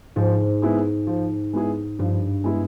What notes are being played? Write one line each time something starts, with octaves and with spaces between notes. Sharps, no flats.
G#2 F3
G#3 B3 E4 G#4
F3
G#3 B3 E4 G#4
G2 F3
G#3 B3 E4 G#4